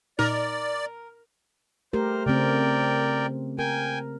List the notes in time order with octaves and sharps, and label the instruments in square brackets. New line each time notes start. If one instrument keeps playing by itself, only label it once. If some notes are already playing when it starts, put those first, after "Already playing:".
[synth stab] A#2 D#4 [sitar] A#4 [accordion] D5
[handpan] A3 G4 A#4 [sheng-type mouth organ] C5
[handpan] C#3 A3 C4 [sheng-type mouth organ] A#4 D5 G5
[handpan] A#4 [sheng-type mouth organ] G5 G#5